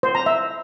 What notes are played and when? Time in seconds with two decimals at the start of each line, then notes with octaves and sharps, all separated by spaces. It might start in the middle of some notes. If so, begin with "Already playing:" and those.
0.03 C5
0.15 A#5
0.26 E5